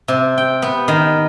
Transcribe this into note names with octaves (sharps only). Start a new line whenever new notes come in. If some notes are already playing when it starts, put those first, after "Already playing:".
C3
G5
B3
D#3